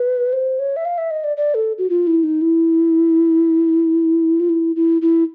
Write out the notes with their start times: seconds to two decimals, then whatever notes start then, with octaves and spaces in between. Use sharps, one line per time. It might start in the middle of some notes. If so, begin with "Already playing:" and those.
Already playing: B4
0.33 C5
0.59 C#5
0.76 E5
0.85 F5
0.98 E5
1.11 D#5
1.24 D5
1.37 D5
1.55 A4
1.78 F#4
1.90 F4
2.07 E4
2.23 D#4
2.41 E4
4.40 F4
4.49 E4
4.76 E4
5.02 E4